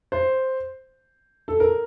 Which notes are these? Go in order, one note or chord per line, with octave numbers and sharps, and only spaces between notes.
C5
A4
A#4